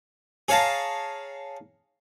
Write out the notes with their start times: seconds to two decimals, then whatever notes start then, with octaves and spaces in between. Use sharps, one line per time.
0.48 G#4 C#5 F5 A5 A#5